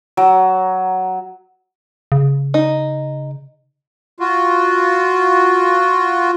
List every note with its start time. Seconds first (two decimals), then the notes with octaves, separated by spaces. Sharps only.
0.17 F#3
2.12 C#3
2.54 D#4
4.20 F4 F#4